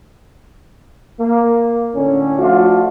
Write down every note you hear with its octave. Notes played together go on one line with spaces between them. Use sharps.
A#3
A2 D3 C#4
F3 A3 D4 F4 F#4